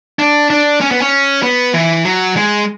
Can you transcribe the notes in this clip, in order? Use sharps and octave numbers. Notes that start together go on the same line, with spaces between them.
D4
D4
C#4
B3
C#4
B3
E3
F#3
G#3